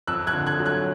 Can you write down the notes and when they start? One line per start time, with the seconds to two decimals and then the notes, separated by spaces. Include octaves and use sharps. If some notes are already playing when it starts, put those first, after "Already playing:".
0.07 F2 E6 F#6
0.27 F#6 G#6
0.33 D3
0.46 F#6 G#6
0.59 F#3
0.66 F#6 G#6